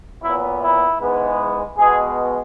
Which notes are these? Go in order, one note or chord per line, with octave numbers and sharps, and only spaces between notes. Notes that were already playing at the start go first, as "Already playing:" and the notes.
A#2 F#3 B3 E4
E4
G#2 E3 G#3 B3
B2 G#3 B3 G#4